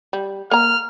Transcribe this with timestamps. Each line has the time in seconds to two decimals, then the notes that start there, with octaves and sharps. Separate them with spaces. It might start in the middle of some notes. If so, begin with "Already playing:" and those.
0.13 G3
0.51 A#3 A#5 F6